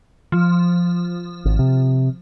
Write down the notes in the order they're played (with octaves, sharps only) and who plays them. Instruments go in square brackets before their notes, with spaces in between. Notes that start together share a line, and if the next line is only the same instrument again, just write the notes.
[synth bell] F3
[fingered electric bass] G#1
C3